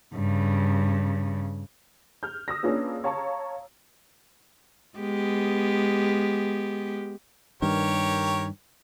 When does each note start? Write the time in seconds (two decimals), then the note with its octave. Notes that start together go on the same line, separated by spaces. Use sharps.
0.14 G2 C#3
2.23 F6 G6
2.48 D#6 E6 A#6
2.63 A#3 C#4 D4 F4 G#4 B4
3.04 C#5 F5 A5 A#5 C#6
4.98 G#3 B3 G4
7.62 G2 D#3 G4 A#4 C#5